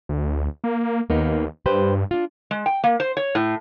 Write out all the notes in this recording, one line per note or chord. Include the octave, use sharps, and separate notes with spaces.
D2
A#3
D#2 A#3 B3 D#4
G2 G4 B4 C5
D4 F4
G#3
G5
A#3
C5
C#5
A2